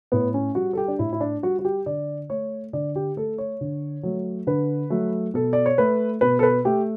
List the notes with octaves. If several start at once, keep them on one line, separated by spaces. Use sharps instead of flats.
A2 B3
C#4
G3 F#4
A4
G4
D4
A2 E4
E4
D4
G3 F#4
F#4
G4
D3 D5
A3 C#5
D3 D5
G4
A3 A4
C#5
D3
F#3 A3
D3 B4
F#3 A3
B2 A4
D5
C#5
A3 B4
B2 B4
A4
B4
A3 G4